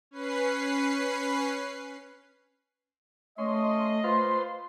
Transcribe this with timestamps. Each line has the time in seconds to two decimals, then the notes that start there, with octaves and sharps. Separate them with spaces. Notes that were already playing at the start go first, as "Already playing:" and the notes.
0.11 C#4 B4 C7
3.38 A3 C#4 D#5 C6
4.04 F4 B4 C5 C6